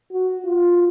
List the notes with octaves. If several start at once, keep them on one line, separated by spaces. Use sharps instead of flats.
F#4
F4